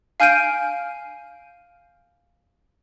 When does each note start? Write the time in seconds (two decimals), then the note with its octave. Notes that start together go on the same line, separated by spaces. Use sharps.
0.20 F5 G#5 F6 G6 D7 D#7